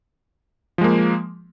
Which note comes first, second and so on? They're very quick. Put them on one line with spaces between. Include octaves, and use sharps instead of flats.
F3 G#3 A#3